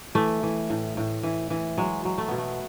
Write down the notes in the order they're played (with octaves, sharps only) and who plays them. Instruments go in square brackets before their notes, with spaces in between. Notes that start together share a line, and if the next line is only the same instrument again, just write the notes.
[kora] E3 A3
E3
A2
A2
E3
E3
F#3 G#3
F#3
A3
B2 B3
A3